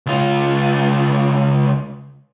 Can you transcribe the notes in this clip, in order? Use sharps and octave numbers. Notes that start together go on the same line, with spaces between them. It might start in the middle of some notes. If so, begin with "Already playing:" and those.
C#2 F4